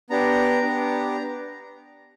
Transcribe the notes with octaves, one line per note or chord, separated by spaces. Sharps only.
B3 D4 G4 A#5
B3 D4 G4